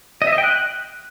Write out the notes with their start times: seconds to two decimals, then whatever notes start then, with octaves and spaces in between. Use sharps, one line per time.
0.22 D#5
0.27 E5
0.33 D#5
0.38 G5
0.43 F#6